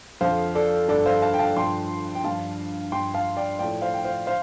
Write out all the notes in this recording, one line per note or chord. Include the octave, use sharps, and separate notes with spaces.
F2 D3 F3 C5 F5
A4 D5
G2 D3 F3 A4 D5
C5 F5
F5 A5
G5
F5 A5
G2 F3 G5 C6
G5
G2 F3 F5 A5
G2 F3 G5 C6
F5 A5
D5 G5
A2 F3 D5 G5
C5 F5
G5
C5 F5
C5 F5